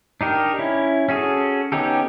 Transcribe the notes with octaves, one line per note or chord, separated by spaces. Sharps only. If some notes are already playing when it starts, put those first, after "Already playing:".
D4 D#4 G4 A#4
C#4 E4
C#4 F#4 G#4 A4
B3 C#4 D#4 G4 A4